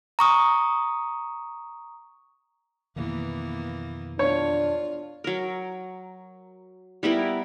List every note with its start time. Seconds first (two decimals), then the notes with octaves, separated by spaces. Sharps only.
0.19 A#5 C#6 D#6
2.96 F2 B2 D#3 E3 A#3 B3
4.19 E2 D4 F4 C#5
5.24 F#3 A#4
7.03 G3 B3 E4 A#4